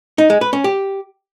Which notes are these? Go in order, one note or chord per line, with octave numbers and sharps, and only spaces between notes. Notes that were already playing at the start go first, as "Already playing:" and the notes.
D#4
G#3
B4
C#4
G4